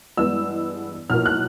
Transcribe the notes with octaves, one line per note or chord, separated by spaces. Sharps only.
G2 E3 G#3 B3 E6
B1 A2 F3 A#3 F6
F#6